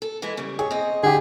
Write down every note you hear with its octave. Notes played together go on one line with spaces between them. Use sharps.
A4
E3 G#3 E4
C#3 G3
G#4 C#5
C4 D#5
D3 G4 G#4